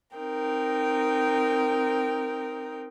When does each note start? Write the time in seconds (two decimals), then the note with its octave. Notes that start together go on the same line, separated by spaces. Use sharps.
0.17 C4 D#4 A#4 G5